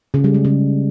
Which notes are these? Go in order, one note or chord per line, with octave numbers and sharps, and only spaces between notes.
C#3
G3
G#3
C#3